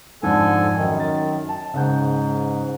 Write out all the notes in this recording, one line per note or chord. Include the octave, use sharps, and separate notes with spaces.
F2 G#2 D3 A4 G#5
F#2 D#3
A6
A5
G#2 C#3 F#5 G6